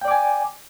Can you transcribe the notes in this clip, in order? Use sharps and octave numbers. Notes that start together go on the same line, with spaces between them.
D5 G5 G#5 D6